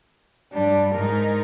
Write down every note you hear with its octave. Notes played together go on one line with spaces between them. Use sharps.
G2 G3 D4
G#2 D#4 A#4